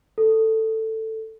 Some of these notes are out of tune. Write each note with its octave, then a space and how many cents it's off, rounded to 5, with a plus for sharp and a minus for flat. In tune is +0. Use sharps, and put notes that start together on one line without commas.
A4 +10